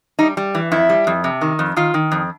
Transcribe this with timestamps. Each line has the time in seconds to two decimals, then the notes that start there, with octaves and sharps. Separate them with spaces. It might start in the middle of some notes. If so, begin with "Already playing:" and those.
0.19 G3 D#4
0.37 G3
0.55 E3
0.71 F2 E4
0.89 G3
1.07 F2
1.24 C3
1.41 D#3
1.59 F2
1.76 D#3 F4
1.94 D#3
2.11 F2